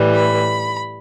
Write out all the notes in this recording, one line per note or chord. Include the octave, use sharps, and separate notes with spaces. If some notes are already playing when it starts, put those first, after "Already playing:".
Already playing: A2 E3 G3
B5